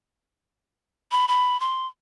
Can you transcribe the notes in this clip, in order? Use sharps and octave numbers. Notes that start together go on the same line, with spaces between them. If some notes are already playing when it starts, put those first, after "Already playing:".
B5
B5
C6